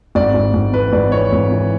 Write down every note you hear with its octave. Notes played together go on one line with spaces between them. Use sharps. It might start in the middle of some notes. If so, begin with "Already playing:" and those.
G#1 D5
G#1
G#1
E3 B4
G#1 D5
E3 C#5
G#1
E3